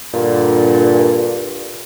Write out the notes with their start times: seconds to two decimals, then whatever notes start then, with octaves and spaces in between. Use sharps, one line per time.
0.14 G2 A#2 D3